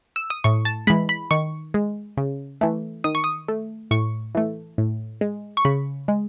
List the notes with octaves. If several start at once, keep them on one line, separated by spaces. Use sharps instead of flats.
E6
D#6
A2 C#6
A5
E3 G#3 B5
B5
D#3 C#6
G#3
C#3
E3 A3
D#3 D#6
C#6
D#6
A3
A2 C#6
E3 A3
A2
G#3
C#6
C#3 B5
G#3